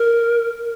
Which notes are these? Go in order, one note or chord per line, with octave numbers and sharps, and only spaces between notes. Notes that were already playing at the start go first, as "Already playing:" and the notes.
Already playing: A#4